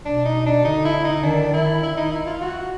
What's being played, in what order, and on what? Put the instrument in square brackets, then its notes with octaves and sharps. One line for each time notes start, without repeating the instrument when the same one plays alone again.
[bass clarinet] B2 [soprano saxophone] D4
[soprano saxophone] D#4
D4
[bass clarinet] D3 [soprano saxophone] D#4
[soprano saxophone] E4
D#4
[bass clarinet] D#3 [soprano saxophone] D4
[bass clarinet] D#3 [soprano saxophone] E4
[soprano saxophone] E4
D#4
E4
F4
F#4